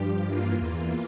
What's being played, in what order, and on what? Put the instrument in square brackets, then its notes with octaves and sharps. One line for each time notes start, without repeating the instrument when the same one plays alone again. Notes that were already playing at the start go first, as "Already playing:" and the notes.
Already playing: [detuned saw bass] G2 [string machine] F3 G4
[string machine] E3 A#3 F4
[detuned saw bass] E2